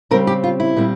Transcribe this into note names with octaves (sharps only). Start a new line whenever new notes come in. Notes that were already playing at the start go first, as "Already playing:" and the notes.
C#3 G3 C4 A#4
G4
F4
E4
A#2 G3 C4